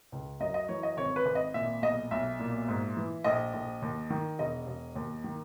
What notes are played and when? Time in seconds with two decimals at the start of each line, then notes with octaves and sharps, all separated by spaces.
0.12 C#2
0.40 F#2 D#5
0.54 D#5
0.68 E3 C#5
0.83 D#5
0.97 G#1 C#5
1.16 B4
1.26 G#1
1.35 D#5
1.54 A#2 E5
1.82 B1 D#5
2.11 B1 E5
2.39 A#2
2.68 G#2
2.97 E3
3.24 A#1 D#5
3.54 A#1
3.82 D#2
4.10 D#3
4.39 E1 D#5
4.67 E1
4.96 D#2
5.24 D#3